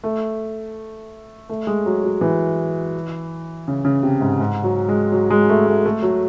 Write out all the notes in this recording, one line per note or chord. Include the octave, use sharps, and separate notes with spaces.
A3
A3
G#3
F#3
F#3
E3
C#3
C#3
C3
G#2
G#2
F#3
G#3
F#3
G#3
A3
A3
A3
F#3